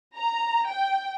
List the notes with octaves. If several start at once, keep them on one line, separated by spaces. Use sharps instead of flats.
A#5
G5